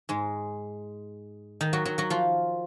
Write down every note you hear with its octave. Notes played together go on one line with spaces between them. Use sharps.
G#2 G#3
D#3 D#4
F#3 F#4
F#3 F#4
F#3 F#4
F3 F4